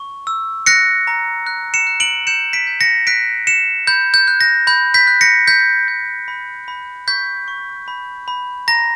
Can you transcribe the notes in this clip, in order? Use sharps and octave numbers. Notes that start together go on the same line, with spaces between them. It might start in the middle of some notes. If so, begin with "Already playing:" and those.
Already playing: C#6
E6
F#6 A#6 C#7
A#5
F#6
C#7 E7
F#6
D7 F#7
G6 C#7 E7
B6 D7
G6
A#6 C#7
F#6 B6 D7
F#6 C#7 E7
B5 G6
G6
F#6
A#6
B5 G6
G6 B6
F#6
A#6 C#7
G6 B6
G6
B5
B5
C#6 G6 B6
C#6
B5
B5
A#5 A#6